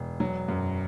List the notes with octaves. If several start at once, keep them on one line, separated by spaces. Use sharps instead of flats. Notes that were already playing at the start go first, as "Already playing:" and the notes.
Already playing: E1
F#3
F#2